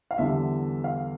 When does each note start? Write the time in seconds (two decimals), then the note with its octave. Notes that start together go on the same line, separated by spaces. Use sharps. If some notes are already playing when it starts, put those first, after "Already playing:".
0.11 F5
0.18 E2 D3 G3 E5
0.84 F5